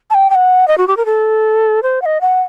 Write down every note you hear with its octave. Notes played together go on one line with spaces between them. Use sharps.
A5
G5
G5
F#5
D#5
F#4
G4
A#4
A4
C5
F#5
D#5
F#5